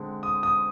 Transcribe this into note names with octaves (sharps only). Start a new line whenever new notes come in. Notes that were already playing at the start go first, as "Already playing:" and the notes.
Already playing: D3 G#3 C4
D#6
D#6